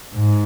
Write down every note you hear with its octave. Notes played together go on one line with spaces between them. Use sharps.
G#2